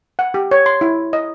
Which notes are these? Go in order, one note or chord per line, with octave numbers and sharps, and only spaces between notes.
F#5
G4
C#5
C6
E4
D#5